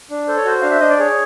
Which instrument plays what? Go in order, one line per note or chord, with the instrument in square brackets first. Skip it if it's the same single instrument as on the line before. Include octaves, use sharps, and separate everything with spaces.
[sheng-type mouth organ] D4
A4 C5
C#5
F#4 C5
D4 F5
E5
D4 D#5
D5
G#4 C#5